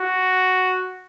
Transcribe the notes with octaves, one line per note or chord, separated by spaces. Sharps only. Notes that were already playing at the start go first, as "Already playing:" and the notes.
Already playing: F#4